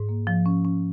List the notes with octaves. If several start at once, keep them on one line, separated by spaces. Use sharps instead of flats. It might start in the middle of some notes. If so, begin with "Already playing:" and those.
Already playing: G#2
A#3
F3
C#4
C#4